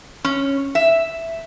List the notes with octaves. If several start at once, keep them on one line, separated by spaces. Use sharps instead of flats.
C#4
E5